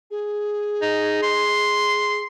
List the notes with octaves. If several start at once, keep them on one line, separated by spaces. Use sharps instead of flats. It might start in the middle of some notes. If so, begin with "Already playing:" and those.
G#4
D#4
C6